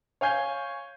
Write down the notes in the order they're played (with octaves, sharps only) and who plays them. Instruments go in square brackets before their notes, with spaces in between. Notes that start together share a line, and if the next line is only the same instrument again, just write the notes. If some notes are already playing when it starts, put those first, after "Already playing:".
[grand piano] C#5 F5 G#5 G6 G#6 C7